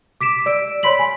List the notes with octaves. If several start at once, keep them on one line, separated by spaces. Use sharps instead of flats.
D6 B6 D7 E7
D5 E6 D7
C#5 D5 B5 C6 B6 F#7
G#5